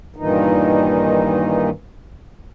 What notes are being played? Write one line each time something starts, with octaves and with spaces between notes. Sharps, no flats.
G2 A#2 D#3 E3 D#4